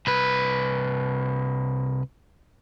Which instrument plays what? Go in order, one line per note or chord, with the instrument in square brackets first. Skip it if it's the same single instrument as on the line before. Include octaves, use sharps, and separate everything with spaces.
[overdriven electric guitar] C2 B4